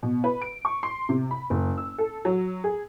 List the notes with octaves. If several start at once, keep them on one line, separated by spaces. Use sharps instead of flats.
B2
B4
D7
C#6
C6
C3
B5
F#1
E6
A4
F#3
G#4